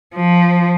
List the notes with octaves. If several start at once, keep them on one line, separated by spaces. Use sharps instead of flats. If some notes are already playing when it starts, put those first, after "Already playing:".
F3